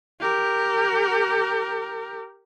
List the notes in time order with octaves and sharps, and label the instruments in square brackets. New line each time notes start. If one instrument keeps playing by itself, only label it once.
[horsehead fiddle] G4 A#4